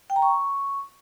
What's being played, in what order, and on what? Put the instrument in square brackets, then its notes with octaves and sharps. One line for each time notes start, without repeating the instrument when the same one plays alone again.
[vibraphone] G5
A#5
C#6